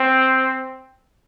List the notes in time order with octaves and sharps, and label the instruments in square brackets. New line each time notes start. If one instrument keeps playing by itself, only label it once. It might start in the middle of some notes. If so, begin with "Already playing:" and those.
Already playing: [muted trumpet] C4